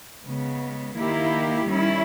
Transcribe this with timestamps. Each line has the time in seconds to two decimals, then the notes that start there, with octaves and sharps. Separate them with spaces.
0.25 C#3 G#3 B3
0.96 D#3 A#3 E4 G4
1.67 D#3 G3 C#4 E4